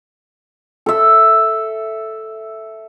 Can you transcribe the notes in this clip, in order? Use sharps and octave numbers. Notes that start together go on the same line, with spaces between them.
A4 E5